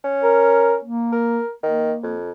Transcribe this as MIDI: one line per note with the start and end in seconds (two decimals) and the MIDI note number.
0.05 0.82 61
0.23 0.76 70
0.84 1.41 58
1.13 1.49 70
1.63 1.93 51
1.63 2.17 58
2.03 2.31 41